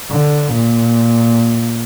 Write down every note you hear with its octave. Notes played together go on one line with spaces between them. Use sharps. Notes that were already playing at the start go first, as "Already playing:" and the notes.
D3
A#2